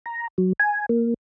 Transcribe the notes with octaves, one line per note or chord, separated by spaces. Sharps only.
A#5
F#3
G#5
A#3